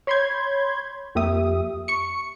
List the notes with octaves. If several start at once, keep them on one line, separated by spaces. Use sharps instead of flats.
C#5 B5 C6 G6 G#6
F2 A#3 G4 E5 D#6
C#6 C#7